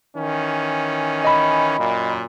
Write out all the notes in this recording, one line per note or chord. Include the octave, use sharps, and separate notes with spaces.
D#3 E3 C#4
D#5 B5
F#2 A#2